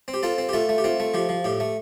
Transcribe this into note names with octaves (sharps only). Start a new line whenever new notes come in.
C4
G4
C4 F4 A4
C4
G4
A3 F4 A4
A3
G4
C4 F4
A3
F3 G4
F3
A2 G4
A3